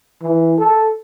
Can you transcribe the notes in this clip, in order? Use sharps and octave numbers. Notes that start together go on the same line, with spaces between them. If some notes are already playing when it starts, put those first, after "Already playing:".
E3
A4